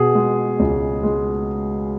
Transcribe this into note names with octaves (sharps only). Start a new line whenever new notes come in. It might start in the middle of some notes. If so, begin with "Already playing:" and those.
Already playing: B2 G#4
G#3
C#2
G#3